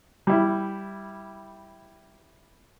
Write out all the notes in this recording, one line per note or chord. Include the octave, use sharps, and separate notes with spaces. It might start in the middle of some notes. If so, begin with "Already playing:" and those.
G3 E4